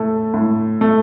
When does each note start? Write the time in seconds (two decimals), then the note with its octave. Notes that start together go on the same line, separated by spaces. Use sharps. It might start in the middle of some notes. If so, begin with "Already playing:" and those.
Already playing: A2 A3
0.34 A2
0.81 A3